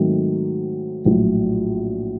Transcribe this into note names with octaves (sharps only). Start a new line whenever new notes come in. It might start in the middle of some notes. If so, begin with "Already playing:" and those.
Already playing: G#2 D#3 F#3 A3 C4
A#1 A2 F#3